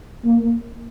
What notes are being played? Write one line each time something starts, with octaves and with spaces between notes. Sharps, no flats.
A#3